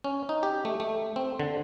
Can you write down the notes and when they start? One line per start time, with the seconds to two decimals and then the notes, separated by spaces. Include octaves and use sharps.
0.04 C#4
0.29 D#4
0.43 G4
0.65 A3
0.80 A3
1.16 C4
1.40 D3